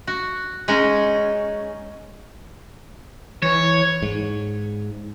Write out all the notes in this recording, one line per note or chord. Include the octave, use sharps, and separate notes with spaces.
F#4
G#3 C#4 D#4
E3 C#5
G#2